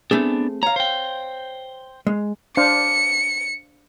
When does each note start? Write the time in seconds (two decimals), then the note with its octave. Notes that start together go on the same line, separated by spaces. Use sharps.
0.11 A3 B3 C4 D4 G#4
0.63 C#5 F5 A#5
0.76 C5 G5
2.07 G#3
2.57 D4 C5 F5 C#7